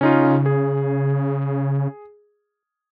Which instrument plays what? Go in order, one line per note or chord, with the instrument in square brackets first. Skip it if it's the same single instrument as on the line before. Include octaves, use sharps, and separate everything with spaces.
[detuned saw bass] C#3 [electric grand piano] C#4 D#4 F4
[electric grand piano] G#4